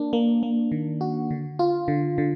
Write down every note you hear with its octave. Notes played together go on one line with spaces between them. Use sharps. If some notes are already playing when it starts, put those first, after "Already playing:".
Already playing: A#3 D4
A#3
A#3
D#3
F#4
D3
F4
D3
D3